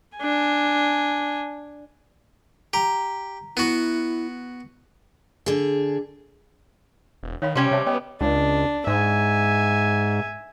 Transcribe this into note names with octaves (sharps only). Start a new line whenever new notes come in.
D4 G#5
G4 A#5
B3 E4 F#4
D3 G#4
E1
D#3 C#5 F5 B5
C3 G3 C#4 G4 C6
C3 C#5 E5 A5
B3 C#5 D#5 G5
C#2 D4
G#2 E5 G#5